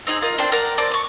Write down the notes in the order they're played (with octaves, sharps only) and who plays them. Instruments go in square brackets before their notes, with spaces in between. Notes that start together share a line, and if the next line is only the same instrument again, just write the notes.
[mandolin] C4 D#4 F4 G#4
F4 A#4 D#5
C4 D4 C5 G5
A#4 D5 F#5 G5
C4 D5 A5
C#6 D6